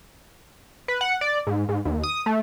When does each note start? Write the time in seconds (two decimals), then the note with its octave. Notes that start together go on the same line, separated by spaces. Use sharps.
0.88 B4
1.01 F#5
1.21 D5
1.47 G#2
1.69 G#2
1.85 D#2
2.03 D#6
2.26 A3